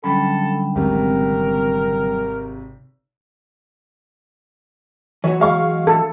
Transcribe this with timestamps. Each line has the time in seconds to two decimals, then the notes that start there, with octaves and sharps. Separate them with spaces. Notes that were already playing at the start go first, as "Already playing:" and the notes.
0.04 D3 F#3 G3 C#4 A4 G5 B5
0.75 G#1 C3 A#4
5.24 E3 F#3 F#4 C#5
5.40 G#3 F5 C#6
5.87 A4